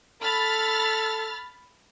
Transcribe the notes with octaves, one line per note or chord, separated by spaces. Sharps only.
A4 B5 F6 A6